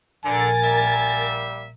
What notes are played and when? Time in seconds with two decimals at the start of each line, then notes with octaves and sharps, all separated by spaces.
0.25 A#1 D3 A#4 G#5 A6
0.63 G3 A#3 E5